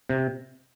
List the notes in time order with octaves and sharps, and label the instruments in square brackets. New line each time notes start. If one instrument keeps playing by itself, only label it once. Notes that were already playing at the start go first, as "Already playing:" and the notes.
[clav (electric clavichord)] C3